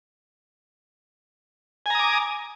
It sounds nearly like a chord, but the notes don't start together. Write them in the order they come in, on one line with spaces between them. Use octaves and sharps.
G#5 A#5 D#6 D6